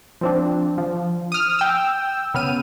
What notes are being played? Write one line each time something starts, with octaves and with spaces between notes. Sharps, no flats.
F3 C4 D4
F3
D#6 F6
G5 E6
C#3 B3 F6 D#7